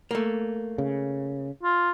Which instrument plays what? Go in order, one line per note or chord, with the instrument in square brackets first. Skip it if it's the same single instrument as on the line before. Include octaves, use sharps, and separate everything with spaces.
[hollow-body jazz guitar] A3 A#3
[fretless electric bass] C#3
[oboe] F4